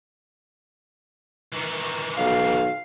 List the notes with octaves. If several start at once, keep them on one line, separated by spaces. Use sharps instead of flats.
D#3 E3
B1 F5